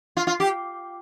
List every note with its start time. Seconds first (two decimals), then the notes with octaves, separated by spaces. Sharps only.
0.17 F4
0.27 F4
0.40 G4